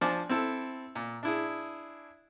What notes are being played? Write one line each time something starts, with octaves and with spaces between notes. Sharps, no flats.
F3 D4 C5 D5 G#5
C4 E4 A4
A#2
D4 E4 G#4